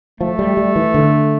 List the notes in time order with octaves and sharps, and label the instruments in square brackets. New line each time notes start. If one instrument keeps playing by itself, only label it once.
[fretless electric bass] F3 [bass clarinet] A3
[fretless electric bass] G3
G3
E3
D3